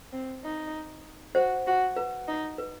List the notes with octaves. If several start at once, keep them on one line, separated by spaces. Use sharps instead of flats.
C4
D#4
F#4 C5
F#4
B4
D#4
B4